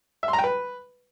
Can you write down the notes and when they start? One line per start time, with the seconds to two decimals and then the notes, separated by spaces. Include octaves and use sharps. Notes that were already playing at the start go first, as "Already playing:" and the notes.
0.23 E5
0.28 C6
0.33 A#5
0.38 G5
0.44 B4